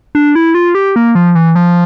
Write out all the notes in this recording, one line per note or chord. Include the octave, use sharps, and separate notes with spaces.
D4
E4
F4
G4
A#3
F3
E3
F3